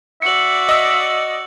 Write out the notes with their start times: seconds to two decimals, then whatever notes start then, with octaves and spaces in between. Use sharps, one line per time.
0.22 F#4 D5 E5 C#7 F#7
0.69 D#5 E6